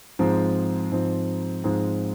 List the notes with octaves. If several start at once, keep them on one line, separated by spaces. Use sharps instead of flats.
G#2 F3 G#3 C4
G#2 F3 G#3 C4
G#2 F3 G#3 C4